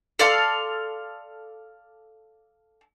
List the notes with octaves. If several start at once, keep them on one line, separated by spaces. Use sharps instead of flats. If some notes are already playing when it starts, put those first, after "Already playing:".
A4 D5 F5 C6